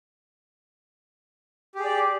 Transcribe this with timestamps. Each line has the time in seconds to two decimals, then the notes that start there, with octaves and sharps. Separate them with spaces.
1.75 G4
1.80 G#4
1.84 D5